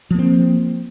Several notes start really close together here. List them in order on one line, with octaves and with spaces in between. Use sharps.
F3 A#3 C4